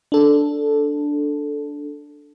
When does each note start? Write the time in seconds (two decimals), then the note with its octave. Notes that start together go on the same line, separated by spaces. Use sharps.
0.12 D4 A4